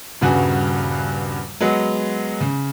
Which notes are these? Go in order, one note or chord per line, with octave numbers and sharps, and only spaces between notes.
D#1 G2 C#3 F#4 B4 G#5
F#3 G#3 B3
C#3